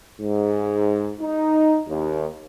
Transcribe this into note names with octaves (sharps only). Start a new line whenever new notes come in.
G#2
D#4
D#2